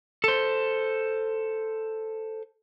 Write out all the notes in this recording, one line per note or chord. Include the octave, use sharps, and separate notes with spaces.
A4 C5